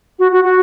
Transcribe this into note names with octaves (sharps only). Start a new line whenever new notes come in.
F#4
F#4
F#4